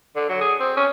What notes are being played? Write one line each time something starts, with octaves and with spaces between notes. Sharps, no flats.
D3
F#3
G#4
C4
C#4